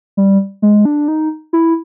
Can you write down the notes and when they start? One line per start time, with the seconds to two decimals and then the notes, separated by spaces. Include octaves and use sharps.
0.17 G3
0.62 G#3
0.85 D4
1.08 D#4
1.53 E4